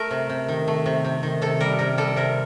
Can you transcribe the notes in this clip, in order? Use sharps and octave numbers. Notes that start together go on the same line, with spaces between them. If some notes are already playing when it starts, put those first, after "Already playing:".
Already playing: A3 A#4
C3
C3
D#3
A3
C3
C3
D#3
C3 A4
G3 A#4
C3 A#4
G3 A4
C3 A#4